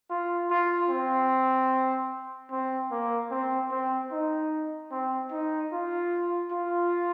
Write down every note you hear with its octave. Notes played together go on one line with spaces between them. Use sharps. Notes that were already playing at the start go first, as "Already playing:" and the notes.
F4
F4
C4
C4
A#3
C4
C4
D#4
C4
D#4
F4
F4